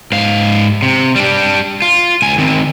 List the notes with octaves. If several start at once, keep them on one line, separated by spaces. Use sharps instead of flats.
G#2 F5
C3
G3 D4
F4
C#2 G#5
D#3 C4